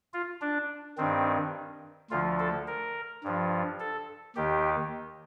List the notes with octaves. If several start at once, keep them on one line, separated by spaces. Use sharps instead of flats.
F4
D4
G2 D#3 C4
D2 D3 F3 F4
A4
A#4
G2 F3
A4
D#2 D#3 G4